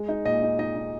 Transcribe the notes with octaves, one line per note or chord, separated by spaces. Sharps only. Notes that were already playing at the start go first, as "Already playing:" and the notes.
Already playing: G#3
D#4
A#2 D#5
D#4
D#4 D#5
D#4